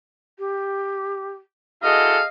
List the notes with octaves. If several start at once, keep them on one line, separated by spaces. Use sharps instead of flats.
G4
E4 F#4 G#4 A4 D#5 F5